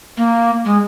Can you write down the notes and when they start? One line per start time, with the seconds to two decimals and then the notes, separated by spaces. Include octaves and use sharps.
0.17 A#3
0.65 G#3